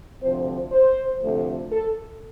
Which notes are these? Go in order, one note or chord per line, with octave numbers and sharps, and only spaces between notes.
D2 C3 F3 C4 C5
C5
D2 C3 F3 A3
A4